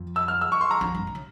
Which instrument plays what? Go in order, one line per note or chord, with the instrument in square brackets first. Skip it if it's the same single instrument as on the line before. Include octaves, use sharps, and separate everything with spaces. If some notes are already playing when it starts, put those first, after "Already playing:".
Already playing: [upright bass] F2
[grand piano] E6
F6
E6
C#6
C6
A#5
[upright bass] F2
G2
A#2
C#3